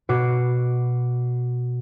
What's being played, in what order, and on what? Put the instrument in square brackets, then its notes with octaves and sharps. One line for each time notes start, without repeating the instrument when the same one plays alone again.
[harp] B2 F#4 D6 C7